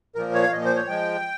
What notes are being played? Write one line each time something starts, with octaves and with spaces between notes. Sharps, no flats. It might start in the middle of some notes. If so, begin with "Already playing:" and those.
A#2 F3 A#3 A#4
C#5
F5
A#2 F3 A#3 D#5
C5
C#5
F3 G#3 G5